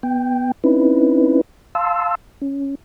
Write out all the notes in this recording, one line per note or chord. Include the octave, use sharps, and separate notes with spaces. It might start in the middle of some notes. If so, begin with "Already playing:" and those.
B3 G5
C4 C#4 D#4 E4 B4
F5 A5 C6 E6
C#4